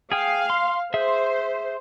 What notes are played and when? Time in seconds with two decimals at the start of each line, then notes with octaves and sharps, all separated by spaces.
0.12 G#4 F5 G5 D#6
0.50 C6
0.94 G#4 C5 E5